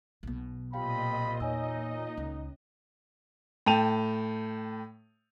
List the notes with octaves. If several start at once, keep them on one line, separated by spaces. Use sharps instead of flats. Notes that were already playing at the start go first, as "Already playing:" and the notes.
B1 B2
A#2 C4 F4 G4 D#5 F5 G5 B5
E2 D#4 C#5 G#5 E6
C#2 C#4
A2 G5 A5 D#7 F7